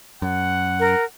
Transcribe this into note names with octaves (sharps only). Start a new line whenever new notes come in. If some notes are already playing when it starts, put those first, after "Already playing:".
F#2 F#5
A#4